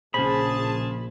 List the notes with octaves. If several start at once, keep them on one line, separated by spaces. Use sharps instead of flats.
A#1 C#3 G#4 C5 A5 B5